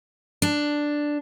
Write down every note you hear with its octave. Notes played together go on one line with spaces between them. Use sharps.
D4